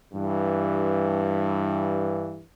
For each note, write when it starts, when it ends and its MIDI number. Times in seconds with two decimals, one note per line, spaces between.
0.13 2.41 43
0.13 2.41 52